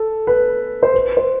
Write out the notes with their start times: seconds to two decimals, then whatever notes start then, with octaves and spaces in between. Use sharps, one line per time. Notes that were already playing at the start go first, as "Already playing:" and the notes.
Already playing: A4
0.27 B4
0.83 C5
0.94 B4
1.17 C5